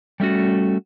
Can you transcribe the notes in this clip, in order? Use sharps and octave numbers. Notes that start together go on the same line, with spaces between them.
G3 A3 C#4 F#4